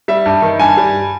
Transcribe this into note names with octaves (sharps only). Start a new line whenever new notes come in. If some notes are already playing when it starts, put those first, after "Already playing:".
G3 E5
G2
D#3
G2 G#5
G3